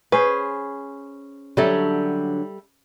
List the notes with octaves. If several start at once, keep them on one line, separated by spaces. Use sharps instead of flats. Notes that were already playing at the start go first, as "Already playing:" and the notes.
C#4 G#4 B4 C5
D3 F#3 G3 D4 A4 E5